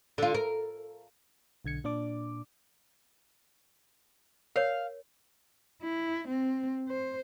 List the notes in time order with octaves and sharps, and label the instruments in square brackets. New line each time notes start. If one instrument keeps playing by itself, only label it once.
[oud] D3 F4
A#4
[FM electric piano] B1 D3 G#6 C#7
A#2 D4 D5 D6
[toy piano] A#4 C#5 [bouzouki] F5
[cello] E4
C4
C5